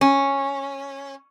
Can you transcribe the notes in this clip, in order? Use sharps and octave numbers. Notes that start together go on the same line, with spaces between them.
C#4